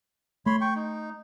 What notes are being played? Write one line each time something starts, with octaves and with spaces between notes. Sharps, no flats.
A3 C#5 B5 C6
G5 C#6
D#4